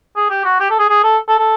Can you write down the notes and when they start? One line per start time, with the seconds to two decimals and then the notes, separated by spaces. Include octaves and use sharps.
0.16 G#4
0.30 G4
0.45 F#4
0.60 G4
0.70 A4
0.79 G#4
0.89 G#4
1.04 A4
1.28 A4
1.38 A4